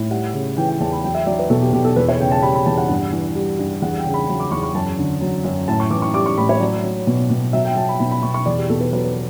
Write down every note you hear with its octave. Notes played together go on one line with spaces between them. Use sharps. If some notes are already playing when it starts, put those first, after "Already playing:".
Already playing: A2
G3 F#5
C#3
E3 G5
G5
E2 A5
B5
F#3 G5
E5
F#3 D5
B4
B2 A4
G4
B2 G4
A4
E2 B4
C#5
C#3 G5
A5
G3 B5
B5
E2 A5
F#5
G2
E3
G3
G2
E2 F#5
G5
C#3
B5
F#3 B5
D6
E2 C#6
C#6
F#2 A5
D3
F#3
F#2
A2 A5
C#6
E3 D6
C#6
G3 D6
C#6
A2 B5
C#5
F#3 D5
F#3
B2
B2
F#3 E5
G5
F#3 A5
B5
B2 B5
B5
B2 C#6
C#6
E2 D5
G4
B2 A4
B4
F#3 B4
B4